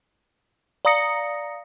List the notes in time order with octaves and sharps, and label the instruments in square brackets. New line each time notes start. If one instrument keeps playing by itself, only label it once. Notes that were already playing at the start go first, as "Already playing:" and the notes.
[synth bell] D5 F5 A#5 D#6 A#6 C#7